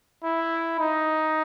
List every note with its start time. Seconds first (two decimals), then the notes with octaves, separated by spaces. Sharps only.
0.24 E4
0.79 D#4